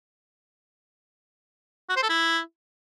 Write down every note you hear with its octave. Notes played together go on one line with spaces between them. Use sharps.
F#4
C5
A4
E4